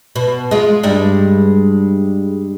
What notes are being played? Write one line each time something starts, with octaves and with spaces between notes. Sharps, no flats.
B2
G#3 F4
G2 G3 G#3